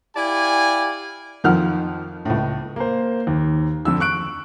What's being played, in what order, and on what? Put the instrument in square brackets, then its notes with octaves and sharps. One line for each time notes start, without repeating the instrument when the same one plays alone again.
[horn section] E4 G4 D5 F5 G#5
[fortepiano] F2 D#3 F3 F#5 F6
C#2 A2
[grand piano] A#3 C5
D#2
F2 D3 E6
C#6 F#6 D7